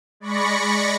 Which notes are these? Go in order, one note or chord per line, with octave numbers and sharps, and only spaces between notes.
G#3 D5 B5 C#6 A#6 C#7